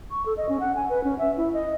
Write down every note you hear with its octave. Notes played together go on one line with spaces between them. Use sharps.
C#6
A4
D#5
C#4
F#5
G#5
B4
C#4
E5
E4
D#5